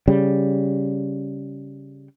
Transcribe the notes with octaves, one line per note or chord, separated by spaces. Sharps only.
C#3 G3